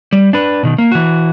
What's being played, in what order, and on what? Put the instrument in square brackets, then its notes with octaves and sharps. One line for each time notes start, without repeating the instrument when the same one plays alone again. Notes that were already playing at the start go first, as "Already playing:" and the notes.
[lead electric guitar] G3
D4 B4
B2 D#3
A#3
E3 F#4